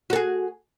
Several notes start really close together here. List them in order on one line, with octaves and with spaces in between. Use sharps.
F#4 A4 G#4